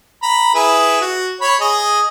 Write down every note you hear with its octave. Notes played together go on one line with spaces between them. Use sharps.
A#5 B5
E4 G#4 B4
F#4
C#5 B5
G#4 D#5